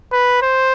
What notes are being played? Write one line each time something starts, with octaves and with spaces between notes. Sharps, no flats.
B4
C5